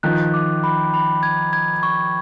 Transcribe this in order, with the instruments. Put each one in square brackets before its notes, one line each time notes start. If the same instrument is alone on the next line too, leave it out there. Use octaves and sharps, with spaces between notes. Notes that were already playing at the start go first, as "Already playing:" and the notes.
[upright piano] D#3 F3 [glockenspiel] F#6
[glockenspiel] D6
B5
B5
G#6
G#6
C#6